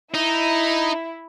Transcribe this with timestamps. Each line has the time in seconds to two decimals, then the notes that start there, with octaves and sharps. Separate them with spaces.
0.14 D#4 E4